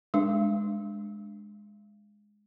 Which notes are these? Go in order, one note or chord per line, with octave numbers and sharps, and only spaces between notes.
G#3 D4